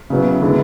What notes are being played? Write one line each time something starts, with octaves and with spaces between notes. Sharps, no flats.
C#3 F#3 B3 E4
D3 G#3 B3 E4